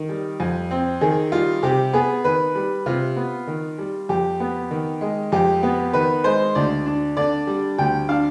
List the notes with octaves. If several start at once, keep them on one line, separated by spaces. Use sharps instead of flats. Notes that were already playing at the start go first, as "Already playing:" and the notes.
Already playing: D#3
G3
F2
C4
D#3 G#4
G3 F4
C3 G4
B3 G#4
D#3 B4
G3
C3 F4
B3
D#3
G3
F2 G4
B3
D#3
G#3
F2 G4
B3
D#3 B4
G#3 C5
D2 D5
D4
D3 D5
G3
D2 G5
D4 F5